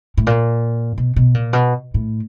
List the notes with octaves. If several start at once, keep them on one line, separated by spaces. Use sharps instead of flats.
A2
A#2
B2
B2
A#2
B2
A2